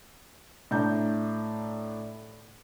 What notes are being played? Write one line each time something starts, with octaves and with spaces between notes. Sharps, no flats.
A2 D4 A#5 G6